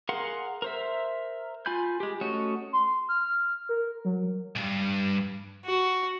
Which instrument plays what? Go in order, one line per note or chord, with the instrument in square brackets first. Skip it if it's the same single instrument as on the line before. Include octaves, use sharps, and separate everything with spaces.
[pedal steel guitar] G#4 A#4 F5 F#5 C6
A#4 C5 E5
F4 G#5 B5 G6
G#3 G4
A3 C#4 F#4 C#5 D#5
[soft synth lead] C6
F6
A#4
F#3
[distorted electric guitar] C2 G2
[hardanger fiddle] F#4